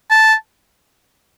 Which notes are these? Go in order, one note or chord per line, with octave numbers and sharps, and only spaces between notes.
A5